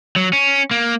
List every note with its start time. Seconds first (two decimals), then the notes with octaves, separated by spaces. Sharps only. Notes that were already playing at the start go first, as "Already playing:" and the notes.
0.16 F#3
0.33 C#4
0.71 A#3